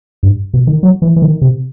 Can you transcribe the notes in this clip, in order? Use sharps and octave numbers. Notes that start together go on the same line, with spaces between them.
G2
B2
D#3
F#3
E3
E3
D#3
C3